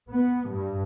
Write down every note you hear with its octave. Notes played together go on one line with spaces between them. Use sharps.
B3
G2